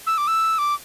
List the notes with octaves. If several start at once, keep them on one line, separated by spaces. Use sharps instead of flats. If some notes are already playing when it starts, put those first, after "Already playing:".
E6
D6
E6
D6